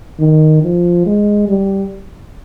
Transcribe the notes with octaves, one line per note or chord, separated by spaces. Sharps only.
D#3
F3
G#3
G3